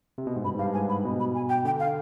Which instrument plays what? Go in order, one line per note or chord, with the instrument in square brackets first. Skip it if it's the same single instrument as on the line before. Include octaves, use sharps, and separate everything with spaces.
[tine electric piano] C3
B2
G#2
[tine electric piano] G2 [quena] B5
[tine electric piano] G#2
[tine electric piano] G2 [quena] F5
[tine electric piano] G#2 [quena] G#5
[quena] B5
[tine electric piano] B2
[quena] B5
G#5
G5
[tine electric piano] D3 [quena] G5
[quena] F5